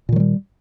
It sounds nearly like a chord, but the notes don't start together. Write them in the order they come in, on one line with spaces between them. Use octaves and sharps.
A#2 D#3 F#3 G3